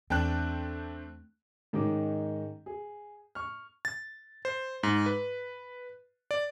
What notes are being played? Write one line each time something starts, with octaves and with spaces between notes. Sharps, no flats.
E2 A3 C4 D4 G5 A5 F#6
G#2 D#3 G#3 C#4 D#4 D6
G#4
C#6 F6
A6
C5
G#2
B4
D5